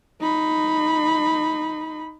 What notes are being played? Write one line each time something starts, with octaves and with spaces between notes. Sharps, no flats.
D#4 B5